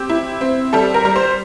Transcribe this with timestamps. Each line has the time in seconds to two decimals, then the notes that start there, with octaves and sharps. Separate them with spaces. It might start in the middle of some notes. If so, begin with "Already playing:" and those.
Already playing: C4 G4
0.10 E4
0.41 C4
0.73 G3 A4
0.94 A#4
1.05 G3
1.16 C5